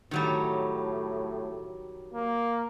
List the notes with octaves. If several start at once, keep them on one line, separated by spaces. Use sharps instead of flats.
A2 D#3 F#3 G3
A#3